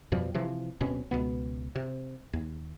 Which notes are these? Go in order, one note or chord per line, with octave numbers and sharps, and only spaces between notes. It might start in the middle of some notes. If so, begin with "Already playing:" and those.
F2 B2 F3 G3
C3 E3 F3
D1 B2 C4 C#4
C#2 F#2 B2 B3
C3
D#2